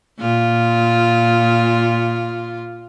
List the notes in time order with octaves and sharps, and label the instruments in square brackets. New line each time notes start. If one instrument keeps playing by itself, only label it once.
[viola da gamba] A#2 F4